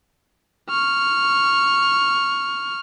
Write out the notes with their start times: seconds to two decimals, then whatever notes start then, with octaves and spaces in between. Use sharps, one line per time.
0.70 C#6 F6